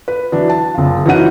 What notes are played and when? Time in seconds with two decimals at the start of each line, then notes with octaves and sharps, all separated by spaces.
0.08 B4
0.32 E3 F#3 D4
0.50 A5
0.74 F#1 F4
1.06 E3 F#3 C#4 D#4 F#5 D#7